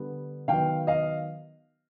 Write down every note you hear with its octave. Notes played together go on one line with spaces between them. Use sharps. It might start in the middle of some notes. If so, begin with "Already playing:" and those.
Already playing: D3 G3 B3
D#3 F#3 B3 F5 G5
D#5 F5